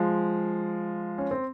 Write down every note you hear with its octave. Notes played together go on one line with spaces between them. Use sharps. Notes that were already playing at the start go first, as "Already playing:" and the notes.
Already playing: F3 G#3
C#4
C4